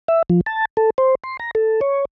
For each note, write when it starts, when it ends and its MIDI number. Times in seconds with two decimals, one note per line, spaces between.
0.08 0.23 76
0.30 0.41 53
0.46 0.65 81
0.77 0.90 69
0.98 1.15 72
1.24 1.37 84
1.39 1.51 82
1.55 1.80 69
1.81 2.05 73